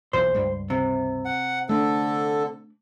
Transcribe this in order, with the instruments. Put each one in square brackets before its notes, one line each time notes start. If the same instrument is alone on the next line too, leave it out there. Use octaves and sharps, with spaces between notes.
[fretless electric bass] B1 E2 A#2 [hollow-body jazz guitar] C5
[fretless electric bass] C#2 G2 G3
[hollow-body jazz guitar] C3
[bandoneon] F#5
[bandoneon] D3 A4 [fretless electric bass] A3 D4